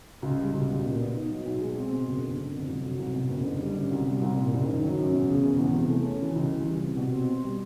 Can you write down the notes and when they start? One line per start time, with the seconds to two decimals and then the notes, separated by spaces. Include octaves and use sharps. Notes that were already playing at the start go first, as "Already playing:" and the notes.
0.22 C#2
0.38 G3
0.53 C#2
0.69 B2
0.84 A#2
1.00 B3
1.15 D#4
1.30 F#3
1.45 B1
1.61 G#3
1.76 C4
1.91 B2
2.07 F#1
2.22 D3
2.37 F#1
2.53 F2
2.68 C2
2.84 F#3
2.98 C2
3.14 B2
3.29 F#1
3.44 D3
3.60 G3
3.75 F#2
3.91 C2
4.06 G3
4.21 C2
4.37 A#2
4.52 F#1
4.67 D#3
4.83 F#3
4.98 F#2
5.13 E1
5.29 C#3
5.44 E1
5.59 E2
5.74 C3
5.90 A3
6.05 C#4
6.21 E3
6.35 C#2
6.51 E3
6.66 G3
6.82 C3
6.97 B2
7.13 C4
7.28 B2
7.43 G3